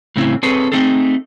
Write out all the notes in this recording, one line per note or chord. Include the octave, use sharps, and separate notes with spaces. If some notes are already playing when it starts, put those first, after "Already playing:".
A2 C#3 A3 C4 C#4 E4
C4 G#4 A4 B4 C#5
A3 C4 D#4 G#4 A4